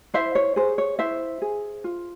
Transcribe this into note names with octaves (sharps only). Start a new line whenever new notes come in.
E4 C5 E5
C#5
G#4 C5
C#5
E4 C5 E5
G#4
F4